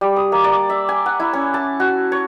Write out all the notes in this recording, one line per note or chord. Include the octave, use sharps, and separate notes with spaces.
G3
D#6
A#3
D5
E5
G#5
F#5
E4
C#4
A5
F#4
C#5